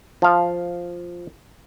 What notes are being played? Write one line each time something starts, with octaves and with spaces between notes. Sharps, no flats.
F3 F5